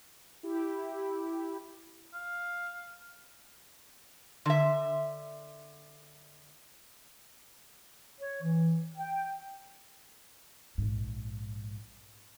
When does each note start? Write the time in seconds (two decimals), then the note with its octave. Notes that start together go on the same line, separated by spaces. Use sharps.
0.43 E4 G4
2.13 F5
4.46 D3 E5
8.21 C#5
8.43 E3
8.98 G5
10.78 A#1 G#2